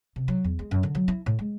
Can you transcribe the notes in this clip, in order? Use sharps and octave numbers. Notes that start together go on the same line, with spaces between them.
C3
F#3
E2
G#3
F#2
D3
F#3
E4
A2
G#3